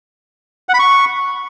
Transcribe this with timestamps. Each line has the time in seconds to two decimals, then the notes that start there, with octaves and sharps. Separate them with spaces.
0.69 F#5
0.74 B5
0.79 C#6